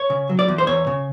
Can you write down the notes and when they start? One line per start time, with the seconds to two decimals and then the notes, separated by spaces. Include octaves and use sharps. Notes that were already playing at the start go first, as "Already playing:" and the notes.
Already playing: C#5
0.10 C#3
0.29 F#3
0.39 D5
0.48 E2
0.58 C5
0.67 E2 C#5
0.87 C#3